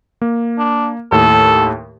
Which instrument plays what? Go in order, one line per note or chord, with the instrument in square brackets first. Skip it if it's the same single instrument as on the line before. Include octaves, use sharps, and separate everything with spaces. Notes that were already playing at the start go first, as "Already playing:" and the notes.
[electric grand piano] A#3
[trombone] D4
[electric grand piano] D#2 A2 [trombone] A4